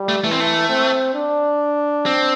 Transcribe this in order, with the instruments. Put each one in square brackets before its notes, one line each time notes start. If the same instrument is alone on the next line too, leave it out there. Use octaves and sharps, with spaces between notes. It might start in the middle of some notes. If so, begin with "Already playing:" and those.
Already playing: [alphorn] G3
[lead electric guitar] A3
[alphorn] E3 [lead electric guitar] A3
[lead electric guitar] C4
A3
[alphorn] C4
D4
[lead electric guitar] C4